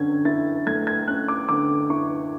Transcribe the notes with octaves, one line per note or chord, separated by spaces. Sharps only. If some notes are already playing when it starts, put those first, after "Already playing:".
Already playing: D3 C#4 G#6
E4 A6
A3 G#6
G#6
C#4 F#6
D6
D3 D6
E4 C#6